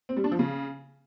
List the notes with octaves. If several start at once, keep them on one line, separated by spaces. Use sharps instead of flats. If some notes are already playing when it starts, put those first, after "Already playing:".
C4
G3
D4
F3
C#3